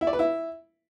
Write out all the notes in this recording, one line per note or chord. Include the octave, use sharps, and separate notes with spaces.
E4
D5
B4
E4